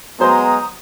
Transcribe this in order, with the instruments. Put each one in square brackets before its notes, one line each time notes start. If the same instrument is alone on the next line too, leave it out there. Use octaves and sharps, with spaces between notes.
[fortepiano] F#3 C5 C6 [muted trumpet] G#3 [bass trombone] B3 [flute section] A#5 D#6